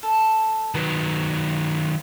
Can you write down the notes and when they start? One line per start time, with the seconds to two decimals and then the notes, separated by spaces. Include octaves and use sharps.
0.03 A4
0.75 D#3 F#3 B4